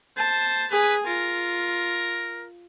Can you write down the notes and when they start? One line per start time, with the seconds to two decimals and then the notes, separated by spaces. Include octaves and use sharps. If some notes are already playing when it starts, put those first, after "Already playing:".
0.17 C5 A5
0.71 G#4 B4 G#5
1.07 F4 A#4